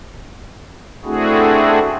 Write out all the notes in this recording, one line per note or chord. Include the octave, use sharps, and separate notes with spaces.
A3 C4 D4 E4 F#4 G#4